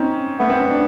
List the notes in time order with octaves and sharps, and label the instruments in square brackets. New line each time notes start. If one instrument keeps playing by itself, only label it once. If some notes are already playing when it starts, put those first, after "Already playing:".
Already playing: [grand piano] C4 C#4 D#4
[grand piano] A3 [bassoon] B3
[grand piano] C4
C#4
D4